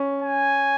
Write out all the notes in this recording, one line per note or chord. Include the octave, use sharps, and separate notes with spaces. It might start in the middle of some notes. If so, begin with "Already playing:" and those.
Already playing: C#4
G#5